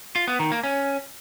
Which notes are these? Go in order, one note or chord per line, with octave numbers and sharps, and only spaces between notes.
F4
B3
D#3
A#3
C#4